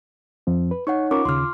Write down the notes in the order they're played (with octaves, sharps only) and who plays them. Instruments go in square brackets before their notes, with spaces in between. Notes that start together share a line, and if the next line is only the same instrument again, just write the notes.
[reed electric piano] F2 F3 C4
B4
[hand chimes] D#4 C#5 F#5 [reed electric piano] C#6
[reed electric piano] C#4 A#4 C#6 [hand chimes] F4 D6
[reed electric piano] D#2 C#3 [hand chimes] C6 F6